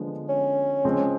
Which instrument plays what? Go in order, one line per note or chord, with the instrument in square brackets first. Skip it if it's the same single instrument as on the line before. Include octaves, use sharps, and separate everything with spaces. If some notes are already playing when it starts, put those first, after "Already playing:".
Already playing: [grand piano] D3 F3 G#3 B3
[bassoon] C#4
[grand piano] C#3 F3 G#3 C4